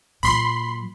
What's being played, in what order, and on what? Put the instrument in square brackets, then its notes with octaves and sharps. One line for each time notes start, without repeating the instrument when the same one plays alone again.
[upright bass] A#2 F#3 [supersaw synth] B5 C6 C7